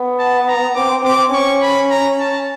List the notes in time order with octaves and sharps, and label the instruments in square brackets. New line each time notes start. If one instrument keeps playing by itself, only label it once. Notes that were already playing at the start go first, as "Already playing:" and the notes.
Already playing: [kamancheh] B3
[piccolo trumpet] A5
A#5
[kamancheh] C4 [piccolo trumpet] D6
[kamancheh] C4 [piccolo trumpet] D6
[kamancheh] C#4 [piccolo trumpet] C#6
[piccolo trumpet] B5
A#5
A5